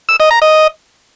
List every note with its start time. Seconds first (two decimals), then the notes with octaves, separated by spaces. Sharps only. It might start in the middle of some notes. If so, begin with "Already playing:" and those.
0.09 E6
0.20 D#5
0.31 A#5
0.42 D#5